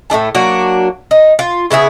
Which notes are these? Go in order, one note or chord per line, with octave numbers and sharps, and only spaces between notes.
A2 A3 D4 A5
F#3 A#3 D4 F#4
D#4
F4
C#3 B3 E4 G#4